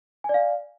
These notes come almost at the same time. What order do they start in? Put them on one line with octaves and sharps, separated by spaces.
G#5 D5 F5